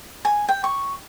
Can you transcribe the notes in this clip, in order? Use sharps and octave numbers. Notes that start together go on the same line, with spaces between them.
G#5
G5
C#6